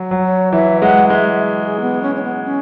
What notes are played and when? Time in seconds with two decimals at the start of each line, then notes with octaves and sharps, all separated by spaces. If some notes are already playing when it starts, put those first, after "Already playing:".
Already playing: F#3
0.11 F#3
0.24 C#5
0.53 E3 E5
0.82 G#3 F#5
1.10 G#3 E5
1.60 G#4
1.81 B3
2.02 C#4
2.15 C#4
2.23 B3
2.44 C#4